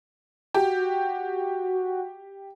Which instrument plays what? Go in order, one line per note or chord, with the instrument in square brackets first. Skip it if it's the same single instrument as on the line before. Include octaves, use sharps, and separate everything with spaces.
[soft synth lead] F#4 [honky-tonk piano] G4